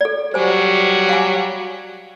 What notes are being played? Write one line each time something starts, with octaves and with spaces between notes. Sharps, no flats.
A4 D5
F#3 G3 C5 G#5
F5 G#5